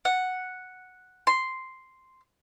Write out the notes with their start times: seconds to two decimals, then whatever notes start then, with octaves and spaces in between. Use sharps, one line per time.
0.05 F#5
1.27 C6